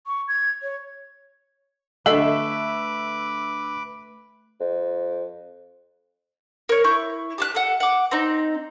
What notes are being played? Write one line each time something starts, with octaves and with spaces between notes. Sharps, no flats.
C#6
G#6
C#5
D3 A3 A4 B4 D#5 E5 D6
F2
A#4 C#5
E4 C#6 G6
G4 A5 F#6
A4 F#5
F#5 D6
C4 D#4